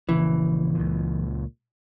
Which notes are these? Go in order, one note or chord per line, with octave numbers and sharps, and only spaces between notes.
A#1 C#3 E3 A#3
C#2 A#2